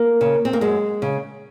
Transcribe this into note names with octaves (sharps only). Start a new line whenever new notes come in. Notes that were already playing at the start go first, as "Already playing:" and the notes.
Already playing: A#3
C#3
C4
A#3
F#2 G#3
C#3